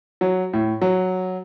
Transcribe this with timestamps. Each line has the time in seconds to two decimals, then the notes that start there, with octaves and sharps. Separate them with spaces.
0.21 F#3
0.53 A2
0.81 F#3